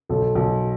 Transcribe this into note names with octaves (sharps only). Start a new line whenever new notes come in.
B1 A4
B1